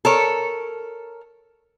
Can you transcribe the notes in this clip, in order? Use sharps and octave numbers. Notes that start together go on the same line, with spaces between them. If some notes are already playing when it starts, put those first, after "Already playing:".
A4 A#4 C#5